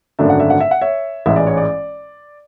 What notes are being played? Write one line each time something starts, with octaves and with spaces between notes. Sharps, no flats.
G#1 F#2 D3 A3 D4 E5
F#5
E5
F#5
E5
F#5
C#5 E5
A1 G#2 E3 G#3 E5
D5
C#5
D5